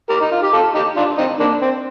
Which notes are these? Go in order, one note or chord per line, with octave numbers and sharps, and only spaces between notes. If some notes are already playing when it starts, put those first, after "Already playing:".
G4 A#4
D#4
F4
G4
F4 A4
D#4 G4
D4 F4
C4 D#4
A#3 D4
C4